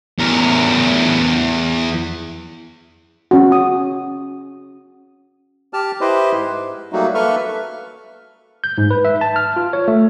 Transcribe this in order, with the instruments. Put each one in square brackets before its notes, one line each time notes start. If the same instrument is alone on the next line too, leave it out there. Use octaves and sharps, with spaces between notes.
[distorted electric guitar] E2 A#4
[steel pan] C#4 F#4
D#6
[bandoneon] G4 A5 F6
E4 G4 B4 C5 D#5
G#2
F#3 G3 A3 A#3 D#4 F#4
A#3 A4 B4 E5 C#6 F6
[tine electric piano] G6
G#2
B4
E5
A5
F6
F4
C#5
A3